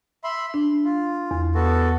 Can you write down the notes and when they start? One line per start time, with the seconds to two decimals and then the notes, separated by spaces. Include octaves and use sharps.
0.24 E5 B5 C6
0.54 D4 C6
0.84 F4
1.31 E2
1.55 B3 F#4 A4